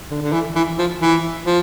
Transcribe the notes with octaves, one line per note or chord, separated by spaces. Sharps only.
D3
D3
E3
E3
F3
E3
F3